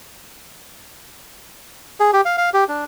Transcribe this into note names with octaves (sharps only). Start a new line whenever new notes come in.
G#4
G4
F5
F5
G4
D4